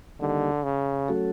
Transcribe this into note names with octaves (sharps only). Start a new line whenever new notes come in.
D3 D#3 G3 A#3 D#4 G4
C#3
F#3 A3 C#4 F#4 A4